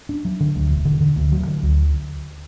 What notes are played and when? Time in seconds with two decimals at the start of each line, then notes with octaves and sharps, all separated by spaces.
0.09 D4
0.25 F#3
0.40 D3
0.56 D2
0.71 E1
0.85 D3
1.01 D3
1.16 D2
1.32 F#3
1.47 D3
1.63 D2